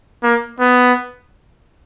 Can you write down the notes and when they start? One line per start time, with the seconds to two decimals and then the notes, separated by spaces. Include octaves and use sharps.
0.23 A#3
0.60 B3